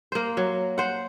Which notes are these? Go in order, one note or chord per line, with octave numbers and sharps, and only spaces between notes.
A#3 C5
F#3
C5 F#5